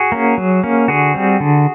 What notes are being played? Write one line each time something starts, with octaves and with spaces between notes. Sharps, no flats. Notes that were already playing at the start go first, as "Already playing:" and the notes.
Already playing: F#4 G#4
A#3 C#4
F#3
A#3 C#4
D3 F#4 G#4
G3 C4
D3